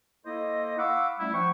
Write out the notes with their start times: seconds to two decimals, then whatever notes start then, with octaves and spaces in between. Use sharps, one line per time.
0.25 A#3 E4 A4 C5 D#5
0.77 F5 F#5 B5 C#6 D6 E6
1.19 G3 A3 C#4 E4
1.33 F3 F#5 G5 C#6